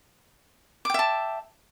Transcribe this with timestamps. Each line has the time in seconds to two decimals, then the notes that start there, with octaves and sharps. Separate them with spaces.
0.85 D6
0.90 G5
0.94 E5
0.99 A5